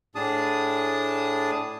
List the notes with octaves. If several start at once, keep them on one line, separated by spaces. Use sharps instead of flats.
A2 D4 G#4 A5 D#6